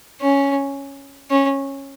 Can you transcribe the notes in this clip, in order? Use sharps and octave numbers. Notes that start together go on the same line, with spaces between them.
C#4
C#4